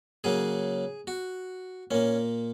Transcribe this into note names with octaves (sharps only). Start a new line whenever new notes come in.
C#3 F#3 A#3 G#4
F#4
A#2 A#3 C#4